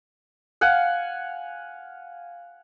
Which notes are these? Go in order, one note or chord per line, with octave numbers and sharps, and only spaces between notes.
F5 F#5 G#5